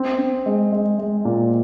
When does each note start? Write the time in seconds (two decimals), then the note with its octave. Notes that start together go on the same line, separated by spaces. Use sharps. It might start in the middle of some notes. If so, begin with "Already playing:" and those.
Already playing: C4
0.18 C4
0.46 G#3
0.72 G#3
0.99 G#3
1.25 A#2